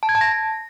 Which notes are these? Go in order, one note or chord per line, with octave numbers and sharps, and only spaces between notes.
A5
G#6
A5
A#6